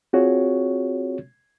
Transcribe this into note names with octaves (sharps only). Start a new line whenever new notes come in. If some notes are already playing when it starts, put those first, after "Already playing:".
C4 F4 F#4 G#4 C#5